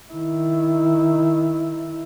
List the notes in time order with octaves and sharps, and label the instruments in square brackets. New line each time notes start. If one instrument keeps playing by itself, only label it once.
[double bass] D#3 E4